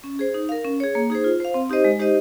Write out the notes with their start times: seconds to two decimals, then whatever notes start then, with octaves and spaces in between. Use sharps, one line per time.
0.04 C#4
0.19 G#4 C5
0.34 D#4
0.49 A#4 F5
0.64 C#4
0.80 G#4 C#5
0.95 A#3
1.10 D#4 G#4 C5
1.24 F4
1.40 C5 F5
1.54 C4
1.69 D#4 G4 C5 D#5
1.84 G#3
2.00 D#4 G4 C5 D#5